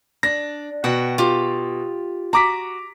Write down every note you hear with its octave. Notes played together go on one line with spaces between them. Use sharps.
D4 A#6
B2 F#4 F#5 G5
F4 G4
F#4 A#5 D6 B6